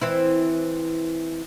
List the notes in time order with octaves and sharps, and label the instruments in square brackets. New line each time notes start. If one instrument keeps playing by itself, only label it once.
[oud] E3 C4 E4